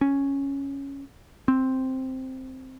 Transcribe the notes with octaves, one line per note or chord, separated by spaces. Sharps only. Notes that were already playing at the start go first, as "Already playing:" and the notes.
C#4
C4